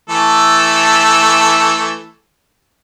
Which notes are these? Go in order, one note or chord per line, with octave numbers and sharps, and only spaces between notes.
E3 A3 A4